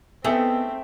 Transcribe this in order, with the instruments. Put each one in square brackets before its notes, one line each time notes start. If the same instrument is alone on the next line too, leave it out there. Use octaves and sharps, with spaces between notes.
[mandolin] A3 [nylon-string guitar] B3 D#4 [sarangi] C4 [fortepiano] G#4 E5 G5